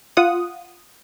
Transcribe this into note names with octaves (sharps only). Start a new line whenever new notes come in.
F4 F#5 D#6